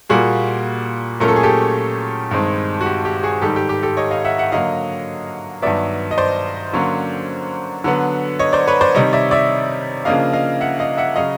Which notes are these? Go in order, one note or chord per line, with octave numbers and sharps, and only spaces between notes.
A#2 G3 A#3 F#4 G#4
A#2 F#3 A3 C#4 A#4
A4
G#4
G4 A4
G2 D#3 G#3 C4
F#4
G4
G4
F#4 G#4
G#2 D#3 G3 G4 A4
G4
G4
G4 A4
C#5 D#5
D#5 F5
E5 F#5
E5 F#5
D3 F#3 A#3 D#5 F5
G2 D#3 F#3 B3 D5 E5
D#5
C5 D5
D3 F#3 A#3 C#4
D3 F#3 B3
C#5 D#5
C5 D5
B4 C#5
C5 D5
C3 D#3 G3 C#5 D#5
D5 E5
D5 E5
C#3 F3 A#3 D4 D#5 F5
D#5 F5
E5 F#5
D#5 F5
E5 F#5
C#3 F#3 D#5 F5